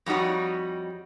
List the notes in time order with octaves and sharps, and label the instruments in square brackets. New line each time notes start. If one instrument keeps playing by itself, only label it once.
[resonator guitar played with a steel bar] F2 G3 D#4 F#4 C#5